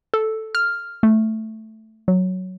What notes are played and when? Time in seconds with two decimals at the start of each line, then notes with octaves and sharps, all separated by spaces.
0.14 A4
0.55 F6
1.03 A3
2.08 F#3